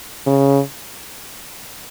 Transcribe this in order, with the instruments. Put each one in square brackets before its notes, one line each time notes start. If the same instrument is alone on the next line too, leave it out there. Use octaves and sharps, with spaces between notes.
[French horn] C#3